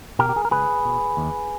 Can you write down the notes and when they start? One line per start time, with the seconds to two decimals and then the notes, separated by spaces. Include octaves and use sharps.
0.19 B2 G4 A#4
0.29 G4
0.36 G#4
0.45 A#4
0.51 C#2 G#4 B4
0.85 B2
1.17 D#2